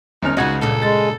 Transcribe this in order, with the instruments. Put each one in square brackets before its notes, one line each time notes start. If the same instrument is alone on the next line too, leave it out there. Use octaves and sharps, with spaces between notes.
[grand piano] G1 C#4 F6 [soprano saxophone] D#4
[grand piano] C#2 F#5 G#6 [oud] C#3 F3 D#4 [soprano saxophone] F#4
[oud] G2 A#2 C#3 [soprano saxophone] A4
[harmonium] G#3 [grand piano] A6